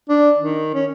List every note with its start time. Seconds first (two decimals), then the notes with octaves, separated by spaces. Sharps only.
0.09 D4
0.38 D#3
0.75 C#4